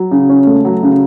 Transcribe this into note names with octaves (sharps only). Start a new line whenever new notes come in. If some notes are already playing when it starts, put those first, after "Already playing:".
Already playing: F#3
C#3
C#4
A3
F#3
C#3